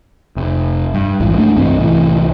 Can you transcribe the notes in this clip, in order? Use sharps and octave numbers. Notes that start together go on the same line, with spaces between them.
F1
G2
A1 D#2 G#2 E3
F#2 A3 D4
C2 G2 E3 C4
C2 A2 E3